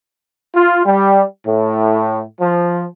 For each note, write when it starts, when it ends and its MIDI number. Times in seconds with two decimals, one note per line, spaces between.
0.55 0.81 65
0.86 1.23 55
1.46 2.21 45
2.41 2.83 53